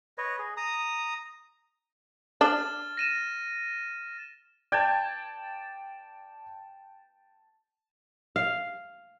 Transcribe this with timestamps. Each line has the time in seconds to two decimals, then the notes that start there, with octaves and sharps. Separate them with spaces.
0.18 B4 C#5 D#5
0.39 G#4
0.57 A#5 D#6
2.41 D4 F6 A6 E7
2.97 A#6 D#7 E7
4.72 D5 G5 A5 G6 G#6
8.36 F5